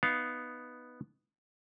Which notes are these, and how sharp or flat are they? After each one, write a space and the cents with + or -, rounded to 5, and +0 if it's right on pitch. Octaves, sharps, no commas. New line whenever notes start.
B3 +0 D#4 +0 F5 +0